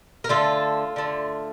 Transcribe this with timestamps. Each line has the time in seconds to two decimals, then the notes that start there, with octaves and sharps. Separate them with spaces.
0.24 A#4
0.29 D3 A3 F4 A4
0.96 D3 A3